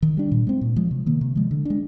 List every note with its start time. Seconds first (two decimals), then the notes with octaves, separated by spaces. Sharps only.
0.02 D#3
0.17 G3 D4
0.31 A#2
0.47 G#3 C4
0.61 A#2
0.76 F3 G#3
0.91 C3
1.06 D#3 A#3
1.21 C3
1.36 F3 G#3
1.51 D3
1.65 G#3 D4